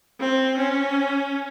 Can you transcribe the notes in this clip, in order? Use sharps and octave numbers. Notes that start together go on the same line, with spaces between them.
C4
C#4